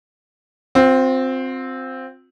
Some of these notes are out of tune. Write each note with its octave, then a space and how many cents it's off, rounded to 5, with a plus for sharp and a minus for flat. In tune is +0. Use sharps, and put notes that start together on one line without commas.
C4 +0 F4 +40